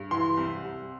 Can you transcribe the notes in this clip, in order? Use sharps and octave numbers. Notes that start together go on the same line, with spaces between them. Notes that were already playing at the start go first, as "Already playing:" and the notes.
Already playing: G2
E3 C6
C2
C2